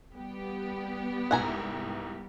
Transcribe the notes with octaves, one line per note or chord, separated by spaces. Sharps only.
G3 B3 G4
C2 G#2 E4 F#5 G#5 A#5